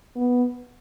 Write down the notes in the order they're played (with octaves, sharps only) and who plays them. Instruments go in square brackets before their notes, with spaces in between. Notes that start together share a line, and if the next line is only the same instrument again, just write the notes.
[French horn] B3